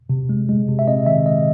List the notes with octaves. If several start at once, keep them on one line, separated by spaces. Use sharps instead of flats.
C3
G#3
G#3
C3
E5
C4 D#5
D#3 E5
G#3 D#5